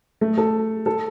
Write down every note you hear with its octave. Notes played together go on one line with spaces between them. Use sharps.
A3
A4
A4